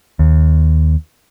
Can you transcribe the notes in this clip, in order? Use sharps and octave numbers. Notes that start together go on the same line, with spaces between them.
D#2